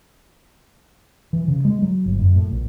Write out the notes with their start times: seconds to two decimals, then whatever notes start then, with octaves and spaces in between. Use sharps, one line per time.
1.33 E3
1.48 C#3
1.65 G#3
1.82 F#3
2.06 G1
2.19 F#2
2.36 A2
2.51 A#1